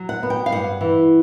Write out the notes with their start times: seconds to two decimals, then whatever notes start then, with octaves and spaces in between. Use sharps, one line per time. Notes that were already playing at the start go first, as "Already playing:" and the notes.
Already playing: F#3
0.09 F#5
0.23 B3
0.30 G5
0.46 F5
0.52 G2 F#5
0.81 E3